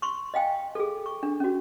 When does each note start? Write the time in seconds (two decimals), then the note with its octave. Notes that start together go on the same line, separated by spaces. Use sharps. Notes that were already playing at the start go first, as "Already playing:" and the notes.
0.02 C6 C#6
0.34 D#5 F5 G5 G#5
0.75 G#4 A4
1.06 C#6
1.23 D4
1.40 C#4 F#4